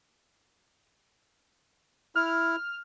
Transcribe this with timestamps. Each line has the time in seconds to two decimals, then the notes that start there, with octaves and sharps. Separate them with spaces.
2.16 E4 F6